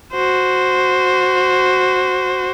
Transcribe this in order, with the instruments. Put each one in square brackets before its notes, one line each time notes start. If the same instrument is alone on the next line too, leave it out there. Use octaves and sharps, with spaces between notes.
[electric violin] F#4 C5